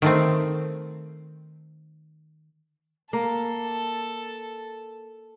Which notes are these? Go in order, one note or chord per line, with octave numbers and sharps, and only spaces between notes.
D#3 A3 C4
A#3 A4